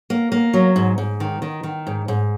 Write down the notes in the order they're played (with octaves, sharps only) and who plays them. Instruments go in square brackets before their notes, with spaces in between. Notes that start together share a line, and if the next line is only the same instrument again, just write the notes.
[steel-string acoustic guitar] A#3
A#3
F#3
G#2
G#2
D#3
D#3
D#3
G#2
G#2